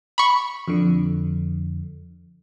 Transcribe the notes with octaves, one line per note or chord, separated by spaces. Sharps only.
B5 C#6
F2 D3